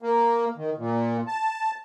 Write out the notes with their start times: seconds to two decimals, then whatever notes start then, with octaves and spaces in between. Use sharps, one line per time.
0.02 A#3
0.57 D#3
0.78 A#2
1.27 A5